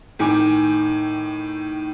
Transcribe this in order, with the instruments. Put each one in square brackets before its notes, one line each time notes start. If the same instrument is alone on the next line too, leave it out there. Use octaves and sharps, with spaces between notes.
[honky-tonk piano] A2 D#3 G#5 D6